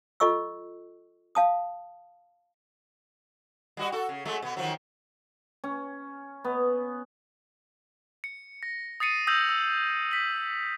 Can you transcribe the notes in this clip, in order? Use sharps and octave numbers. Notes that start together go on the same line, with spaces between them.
F4 A4 D#5 C#6 E6
F5 A5 D#6
G3 F#4 D#5
F#4 A4
C#3
F#3 G#3 A3
B2 B3
D#3 F3 F#3
C#4
B3
C#7
A#6
D#6 A6 C7 C#7 D#7
D#6 E6 G6 A#6 F7 F#7
E6
B6 F#7